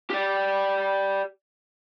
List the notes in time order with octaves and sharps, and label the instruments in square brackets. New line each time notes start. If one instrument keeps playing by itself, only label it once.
[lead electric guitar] G4 D5